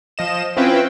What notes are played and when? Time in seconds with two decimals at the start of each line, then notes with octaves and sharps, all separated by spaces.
0.18 F3 D#5 E7
0.57 C4 C#4 E4 F4 B4 G5